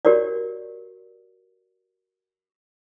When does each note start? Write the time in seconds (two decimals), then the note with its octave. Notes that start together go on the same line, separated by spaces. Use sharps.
0.05 F#4 G4 A#4 C#5 D5